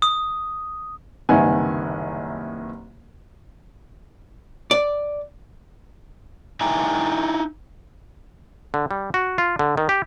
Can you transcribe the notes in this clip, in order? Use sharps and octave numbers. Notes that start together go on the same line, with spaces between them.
D#6
F#1 C2 D#3 B4 F#5 G#5
D5
D#4 E4 E5 G5 G#5 A#5
D3
G3
F#4
F4
D3
D#3
G4